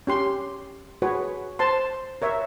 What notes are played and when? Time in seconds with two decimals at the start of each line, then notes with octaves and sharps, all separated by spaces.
0.07 C#4 G4 C6
1.02 F#4 G#4 B4 C#5
1.59 C5 A5 C6
2.22 A#4 C#5 E5